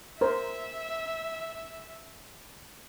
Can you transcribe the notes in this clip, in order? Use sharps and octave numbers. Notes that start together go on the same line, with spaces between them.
A#4 C5 E5